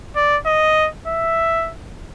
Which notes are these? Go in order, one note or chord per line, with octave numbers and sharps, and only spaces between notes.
D5
D#5
E5